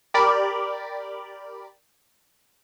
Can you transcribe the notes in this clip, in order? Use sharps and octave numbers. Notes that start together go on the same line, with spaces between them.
G4 A#4 D5 B5